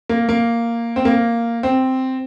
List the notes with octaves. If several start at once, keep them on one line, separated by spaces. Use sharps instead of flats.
A#3
A#3
C4
A#3
C4